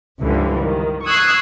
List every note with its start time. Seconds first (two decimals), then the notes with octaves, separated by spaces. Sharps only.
0.19 C#2 G2 D3 E3 F3 G3
0.60 D#3
1.04 C#6 D#6 E6 F#6 G#6 C7